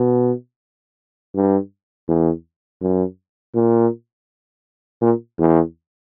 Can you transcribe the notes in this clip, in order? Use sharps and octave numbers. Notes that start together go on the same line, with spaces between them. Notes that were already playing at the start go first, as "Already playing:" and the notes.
Already playing: B2
G2
E2
F#2
A#2
A#2
E2